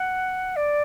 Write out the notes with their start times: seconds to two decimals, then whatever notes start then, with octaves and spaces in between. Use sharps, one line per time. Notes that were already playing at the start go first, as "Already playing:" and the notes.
Already playing: F#5
0.56 D5